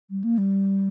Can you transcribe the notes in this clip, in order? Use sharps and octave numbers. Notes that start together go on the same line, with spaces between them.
G3
A#3
G3